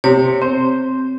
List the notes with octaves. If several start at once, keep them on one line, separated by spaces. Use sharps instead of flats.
C3 C#5
C4 C5